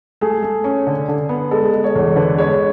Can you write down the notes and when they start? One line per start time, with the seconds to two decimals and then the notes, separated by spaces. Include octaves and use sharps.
0.21 A3 G#4
0.43 A3
0.64 C#4
0.87 D3
1.08 D3
1.29 B3
1.51 G#3 A4
1.73 G#3
1.84 C#5
1.95 E2
2.16 D3 B4
2.38 G#3 C#5